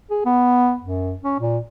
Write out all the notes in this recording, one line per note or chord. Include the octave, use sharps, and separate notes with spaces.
G#4
B3
F#2
C#4
A#2